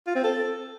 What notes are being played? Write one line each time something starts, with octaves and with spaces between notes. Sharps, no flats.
F4
C4
A4